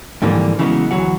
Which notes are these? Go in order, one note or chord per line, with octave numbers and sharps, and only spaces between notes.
F2 G#2 D3 E3 G3 A#3
C#3 E3 F#3 G#3 B3
D2 E3 F#3 F#5